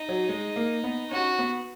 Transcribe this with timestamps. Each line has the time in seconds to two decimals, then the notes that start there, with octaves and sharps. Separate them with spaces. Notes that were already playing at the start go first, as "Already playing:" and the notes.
Already playing: D#4
0.09 F#3
0.29 G#3
0.56 A#3
0.84 B3
1.11 C#4 F#4
1.39 B3